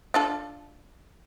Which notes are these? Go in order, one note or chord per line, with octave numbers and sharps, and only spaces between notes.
D4 F4 A4